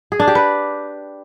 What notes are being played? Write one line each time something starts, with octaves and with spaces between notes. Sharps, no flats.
G#4
D4
G4
B4